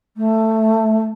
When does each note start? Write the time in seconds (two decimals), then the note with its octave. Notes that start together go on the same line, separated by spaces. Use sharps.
0.16 A3